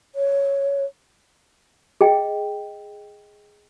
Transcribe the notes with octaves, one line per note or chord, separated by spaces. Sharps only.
C#5
G#4 D#5 G5